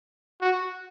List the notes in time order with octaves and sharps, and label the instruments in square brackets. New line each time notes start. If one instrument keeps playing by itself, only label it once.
[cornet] F#4